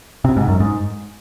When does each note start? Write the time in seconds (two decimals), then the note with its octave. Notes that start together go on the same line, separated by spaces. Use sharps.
0.25 C3
0.36 G#2
0.48 F#2
0.60 G#2